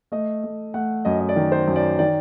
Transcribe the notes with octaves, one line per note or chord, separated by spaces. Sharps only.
A3 D#5
A3
A3 F#5
F#2 D#5
D#5
D5
D#3
C5
F#2
D5
D#3 D5